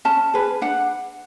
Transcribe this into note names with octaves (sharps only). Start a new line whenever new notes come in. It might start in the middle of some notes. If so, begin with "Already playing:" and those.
C#4 A5
G#4 B4
D4 F#5